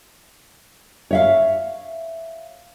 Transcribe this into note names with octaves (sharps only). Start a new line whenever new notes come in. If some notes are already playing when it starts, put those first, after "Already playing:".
C#5 E5 F5